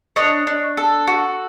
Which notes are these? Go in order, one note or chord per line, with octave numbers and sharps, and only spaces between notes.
D4 C#5 D#5
D4
A4
F#4